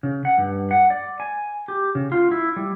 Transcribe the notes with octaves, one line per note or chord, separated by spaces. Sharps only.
C#3
F#5
G2
F#5
D5
G#5
G4
C#3
F4
E4
G3